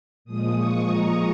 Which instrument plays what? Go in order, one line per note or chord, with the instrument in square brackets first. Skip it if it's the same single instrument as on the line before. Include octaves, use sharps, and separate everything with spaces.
[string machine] A#2 F3 G#3 D#6
C#6
A#5